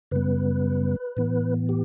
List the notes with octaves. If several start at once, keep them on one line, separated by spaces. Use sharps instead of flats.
F#2 C#3 G3 B3 B4
A2 E3 B3
G4